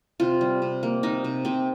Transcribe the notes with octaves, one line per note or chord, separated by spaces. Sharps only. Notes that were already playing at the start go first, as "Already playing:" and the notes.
C3 F4
G3
C3
A#3
C3 D#4
C3
C3 C4